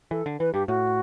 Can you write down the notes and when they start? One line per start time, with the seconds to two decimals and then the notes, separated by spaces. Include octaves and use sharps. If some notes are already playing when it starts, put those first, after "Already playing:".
0.11 E3 A4
0.26 D3
0.40 E3 B4
0.54 G2 G4
0.67 A2 F#4